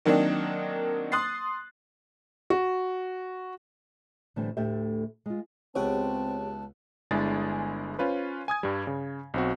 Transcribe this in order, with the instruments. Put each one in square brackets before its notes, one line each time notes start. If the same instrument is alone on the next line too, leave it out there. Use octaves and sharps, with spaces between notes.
[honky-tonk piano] D#3 F#3 A#3 C4 D4 D#4
C6 D#6 F#6 A6 C7
[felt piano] F#4
[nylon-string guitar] A2 D3 E3 G3 A3 C4
D2 A2 D3 A3 G4 E5
G#3 F4
[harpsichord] C#2 B3 [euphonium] C4 [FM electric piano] G4 G#4 C#5 [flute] A5
[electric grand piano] G1 G#3 D4 E4 G#4 A6
C#4 F4 B4 C5
G#5 D#6 G#6
G2 G3
C#3
B1 C4 F#4